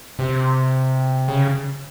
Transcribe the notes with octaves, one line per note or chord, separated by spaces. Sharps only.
C3
C#3